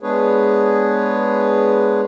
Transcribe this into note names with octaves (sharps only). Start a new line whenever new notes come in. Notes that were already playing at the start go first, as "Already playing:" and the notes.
G#3 B3 D4 G#4 B4 C#5